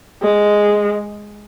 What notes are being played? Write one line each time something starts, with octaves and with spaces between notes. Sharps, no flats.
G#3